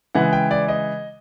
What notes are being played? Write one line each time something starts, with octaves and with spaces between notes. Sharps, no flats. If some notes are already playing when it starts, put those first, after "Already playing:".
C#3 E3 G#3 F#5
G5
D5
D#5